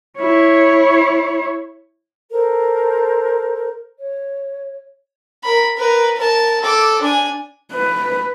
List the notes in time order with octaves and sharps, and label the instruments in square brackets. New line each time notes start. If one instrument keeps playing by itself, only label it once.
[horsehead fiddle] E4 C#5
[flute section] A4 A#4 C5
C#5
[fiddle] A#4 B5
A#4 B4
A#4 A5
A4 D6
D4 G#5
[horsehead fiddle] B4